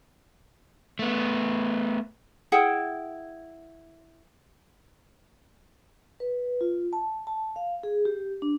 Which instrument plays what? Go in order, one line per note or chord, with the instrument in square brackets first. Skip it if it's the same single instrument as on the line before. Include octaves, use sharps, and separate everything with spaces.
[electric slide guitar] A3 B3
[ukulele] E4 G#4 F#5 G5
[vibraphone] B4
F4
A5
A5
F5
G#4
G4
D4